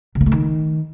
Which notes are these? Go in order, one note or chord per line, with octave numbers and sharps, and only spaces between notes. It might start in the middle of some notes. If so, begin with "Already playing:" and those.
C#3
A#3
A3
D#3